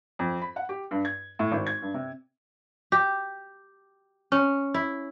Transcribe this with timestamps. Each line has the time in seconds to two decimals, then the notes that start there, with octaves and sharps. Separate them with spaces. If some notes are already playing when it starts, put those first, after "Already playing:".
0.19 F2
0.42 B5
0.56 F#5
0.69 G4
0.91 G2
1.05 G#6
1.39 A2
1.51 G#1
1.67 G#6
1.82 G2
1.94 C3
2.92 G4
4.32 C#4
4.74 E4